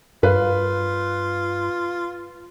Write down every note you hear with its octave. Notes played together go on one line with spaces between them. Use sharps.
G2 F4 B4 F5